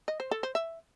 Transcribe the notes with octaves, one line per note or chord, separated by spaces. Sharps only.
D#5
C5
A4
C5
E5